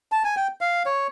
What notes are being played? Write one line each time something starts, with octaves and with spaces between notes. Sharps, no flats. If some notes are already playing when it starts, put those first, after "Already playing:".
A5
G#5
G5
F5
C#5